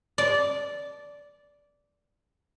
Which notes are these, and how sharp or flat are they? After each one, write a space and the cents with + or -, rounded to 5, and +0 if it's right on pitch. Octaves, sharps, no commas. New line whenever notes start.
D5 -10